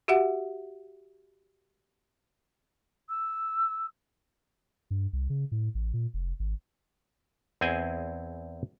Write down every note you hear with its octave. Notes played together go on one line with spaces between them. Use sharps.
F#4 G4 E5 F#5
E6
G2
C2
C#3
A2
A1
A#2
F1
G#1
E2 C4 E4 G#4 D#5 G#5